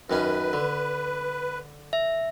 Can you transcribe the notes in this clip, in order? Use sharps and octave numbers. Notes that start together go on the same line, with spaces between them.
F#2 D#3 C#4 B4
D3
E5